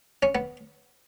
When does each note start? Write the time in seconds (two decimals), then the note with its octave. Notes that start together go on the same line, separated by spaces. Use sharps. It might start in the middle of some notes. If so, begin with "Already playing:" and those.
0.23 C#4
0.35 B3